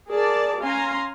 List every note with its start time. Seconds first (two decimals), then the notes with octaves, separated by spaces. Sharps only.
0.11 G#4 A#4 D5 A5
0.62 C#4 F5 G#5 A#5 C6